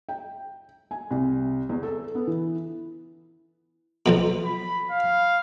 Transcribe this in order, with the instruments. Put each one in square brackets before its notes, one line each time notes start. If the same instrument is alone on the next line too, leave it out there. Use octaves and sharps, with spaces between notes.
[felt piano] G5
G#5
C2
E2
A4
B3
E3
[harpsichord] B1 F2 B2
[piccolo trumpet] B5
F5